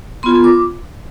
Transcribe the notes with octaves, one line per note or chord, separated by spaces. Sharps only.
B3 F4 C6
D6